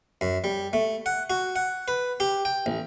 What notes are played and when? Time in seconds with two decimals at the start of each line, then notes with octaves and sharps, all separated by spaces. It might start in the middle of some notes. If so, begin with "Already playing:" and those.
0.21 F#2
0.44 G3
0.73 A3
1.06 F#5
1.30 F#4
1.56 F#5
1.88 B4
2.20 G4
2.45 G5
2.66 A1